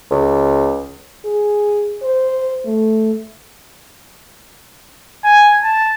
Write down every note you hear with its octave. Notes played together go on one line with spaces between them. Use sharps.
C#2
G#4
C5
A3
G#5
A5